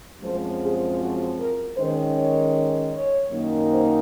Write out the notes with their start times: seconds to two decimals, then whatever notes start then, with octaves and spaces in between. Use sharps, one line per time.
0.21 F#2 F3 G#3 C4 C5
0.61 G#4
0.99 F#4
1.37 A#4
1.76 D#3 G#3 C#4 C5
2.15 C#5
2.91 C#5
3.30 F#2 D#3 A#3 D#4
3.69 C5